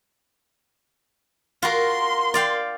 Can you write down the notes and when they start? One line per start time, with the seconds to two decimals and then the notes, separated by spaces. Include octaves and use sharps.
1.62 F4 F#4 A#4 C6
2.34 D5 F5 G5